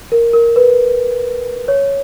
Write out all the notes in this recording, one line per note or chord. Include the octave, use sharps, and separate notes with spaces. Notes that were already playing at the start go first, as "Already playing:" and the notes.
A#4
A#4
B4
C#5